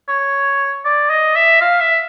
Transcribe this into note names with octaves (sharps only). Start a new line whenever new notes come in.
C#5
D5
D#5
E5
F5
E5